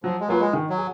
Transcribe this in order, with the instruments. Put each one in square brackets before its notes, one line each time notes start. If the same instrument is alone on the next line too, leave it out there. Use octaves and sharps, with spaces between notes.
[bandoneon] F3 [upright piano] F#3
[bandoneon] G#3
[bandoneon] F#3 [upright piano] A#3 F4 B4
[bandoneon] G#3
[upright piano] D#3
[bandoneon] F#3
[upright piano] G#4